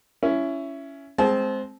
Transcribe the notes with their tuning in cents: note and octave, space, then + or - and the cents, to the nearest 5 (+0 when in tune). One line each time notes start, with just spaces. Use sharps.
C#4 +10 E4 +15
G#3 +10 C4 +0 A5 -30